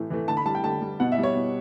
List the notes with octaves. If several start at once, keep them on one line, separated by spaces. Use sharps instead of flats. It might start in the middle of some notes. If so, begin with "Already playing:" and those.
Already playing: A2 E3 A3
E3 A3
D3 A5
B5
G3 A5
G5
D3 A5
G3
B2 F#5
E5
G3
C#5
B2